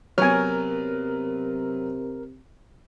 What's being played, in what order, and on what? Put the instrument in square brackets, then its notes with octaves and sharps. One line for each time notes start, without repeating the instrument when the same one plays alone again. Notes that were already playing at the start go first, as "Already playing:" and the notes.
[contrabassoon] C3 [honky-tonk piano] F#3 B3 [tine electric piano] A#4 F6 [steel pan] C#5 G#5